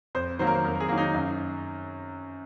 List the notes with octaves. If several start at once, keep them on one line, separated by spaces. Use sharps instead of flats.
F2 C5
D#3 F#3 A#3 C5
A#4
C5
F2 A#4
A#4
G#4
D#3 F#3 A#3
D#4
F#2